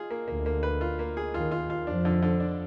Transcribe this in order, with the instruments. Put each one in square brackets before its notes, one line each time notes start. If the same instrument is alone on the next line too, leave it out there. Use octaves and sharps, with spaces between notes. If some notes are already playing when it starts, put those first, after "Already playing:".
Already playing: [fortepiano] F4 G#4
A#3
[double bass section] D2 D3 [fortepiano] A#3
[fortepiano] A#3
B4
F4
A#3
G#4
[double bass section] D#2 D#3 [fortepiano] F4
[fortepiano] F4
F4
[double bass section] F2 F3 [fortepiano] D4
[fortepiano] D3
D3
D4